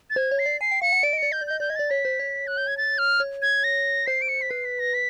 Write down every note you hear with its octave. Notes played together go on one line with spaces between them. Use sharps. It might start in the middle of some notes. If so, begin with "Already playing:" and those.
A6
C5 G#6
C#5
C7
D5
G#5 C7
G5
F5 C#7
F#5
D5 D7
D#5
D5 C#7
D#5 G6
D5
D#5 G6
D5 G6
D#5 G#6
D5 A6
C#5 B6
C5
C#5
F#6
G6
G#6
A6
F6
C#5
G#6
A#6
C5 C7
D7
C#7
B6
B4 C7
B6
A#6
B6